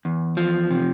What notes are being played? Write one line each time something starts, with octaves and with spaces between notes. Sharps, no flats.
E2
F3
C3